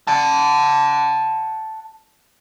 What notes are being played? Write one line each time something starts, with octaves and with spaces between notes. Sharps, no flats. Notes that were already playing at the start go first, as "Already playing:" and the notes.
F#5 A5